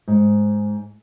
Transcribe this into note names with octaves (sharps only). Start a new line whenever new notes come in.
G#2